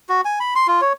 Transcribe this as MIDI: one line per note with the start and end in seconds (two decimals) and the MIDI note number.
0.09 0.21 66
0.25 0.39 80
0.40 0.54 83
0.56 0.67 84
0.68 0.81 65
0.81 0.93 73